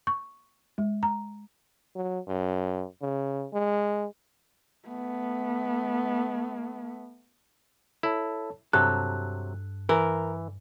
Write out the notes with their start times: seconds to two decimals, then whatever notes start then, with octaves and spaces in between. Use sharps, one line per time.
0.07 C#6
0.78 G#3
1.03 A#5
1.96 F#3
2.28 F#2
3.01 C#3
3.53 G#3
4.88 A3 B3
8.03 E4 A4 C#5 A5
8.73 G2 C3 F#3 A4 F#6
9.89 E3 A#4